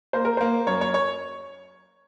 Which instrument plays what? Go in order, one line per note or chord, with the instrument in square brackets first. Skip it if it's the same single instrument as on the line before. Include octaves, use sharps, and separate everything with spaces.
[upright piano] A#3 C5
A#4
A#3 C5
F#2 C#5
C#5
C#5